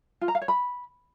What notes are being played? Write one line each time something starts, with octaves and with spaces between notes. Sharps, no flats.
F4
A#5
F5
C#5
B5